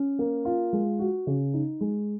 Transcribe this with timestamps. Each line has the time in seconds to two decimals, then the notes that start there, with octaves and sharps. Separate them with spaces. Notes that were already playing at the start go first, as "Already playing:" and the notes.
Already playing: C#4
0.19 A#3
0.45 F4
0.73 G#3
0.99 F#4
1.27 C#3
1.53 D#4
1.81 G#3